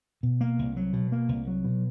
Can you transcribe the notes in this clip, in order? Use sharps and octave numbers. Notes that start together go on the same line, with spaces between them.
B2
A#3
C2
F#3
B2
A#3
C2
F#3
B2